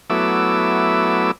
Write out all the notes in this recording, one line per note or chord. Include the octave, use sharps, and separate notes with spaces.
F#3 A3 B3 E4 D6 E6